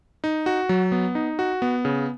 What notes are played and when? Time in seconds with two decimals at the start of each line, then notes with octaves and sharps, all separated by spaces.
0.24 D#4
0.46 F#4
0.69 F#3
0.92 B3
1.15 D#4
1.39 F#4
1.62 B3
1.85 C#3